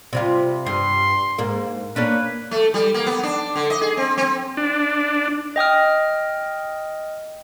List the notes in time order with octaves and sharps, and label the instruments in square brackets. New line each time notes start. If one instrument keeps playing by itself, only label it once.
[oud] C3 G3 F4
[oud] G2 [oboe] C6
[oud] G#2 A#3
[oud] A#3 C#4 D4 [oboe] B4
[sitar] A3
G3
A#3
B3
D4
D3
D#5
G#4
C4
C4
[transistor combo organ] D4
[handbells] D#5 G5 D#6 F6